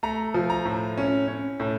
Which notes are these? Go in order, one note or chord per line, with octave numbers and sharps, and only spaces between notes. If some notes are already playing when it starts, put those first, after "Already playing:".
A3 A#5
F3
A#5
A2
C#4
C#4
A2